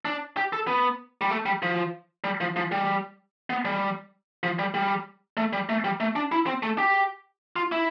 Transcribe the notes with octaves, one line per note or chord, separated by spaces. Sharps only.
D4
G4
A4
B3
G3
A3
G3
F3
G3
F3
F3
G3
B3
G3
F3
G3
G3
A3
G3
A3
G3
A3
D4
E4
C4
A3
G4
F4
E4